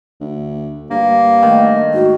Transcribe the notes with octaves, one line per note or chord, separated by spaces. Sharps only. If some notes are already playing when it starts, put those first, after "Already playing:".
D2
G2 A#3
D#3 A3
G#2 F#4